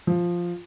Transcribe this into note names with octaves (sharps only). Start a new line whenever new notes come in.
F3